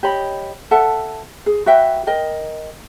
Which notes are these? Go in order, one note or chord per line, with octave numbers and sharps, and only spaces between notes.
G4 C#5 D#5 B5
A4 E5 F#5 A5
G#4
F#4 B4 E5 G5
A#4 D#5 G5